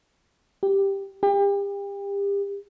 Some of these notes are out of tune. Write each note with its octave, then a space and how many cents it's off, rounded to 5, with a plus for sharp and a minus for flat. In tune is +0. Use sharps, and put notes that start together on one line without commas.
G4 +5
G4 +35